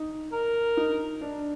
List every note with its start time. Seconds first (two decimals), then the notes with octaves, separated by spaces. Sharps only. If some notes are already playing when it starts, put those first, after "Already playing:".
Already playing: D#4
0.32 A#4
0.77 D#4
1.21 D4